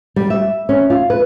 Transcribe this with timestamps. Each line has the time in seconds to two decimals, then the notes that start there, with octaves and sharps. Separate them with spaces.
0.16 G3
0.30 E5
0.69 C#4
0.90 F4
1.10 B4